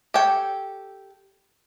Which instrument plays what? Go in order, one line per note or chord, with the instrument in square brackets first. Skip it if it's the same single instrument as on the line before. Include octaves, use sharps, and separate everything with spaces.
[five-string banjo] G4 A4 C#5 G5